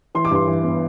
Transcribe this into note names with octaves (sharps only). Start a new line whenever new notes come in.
E3 C6
D6
G2 C6
E3
B3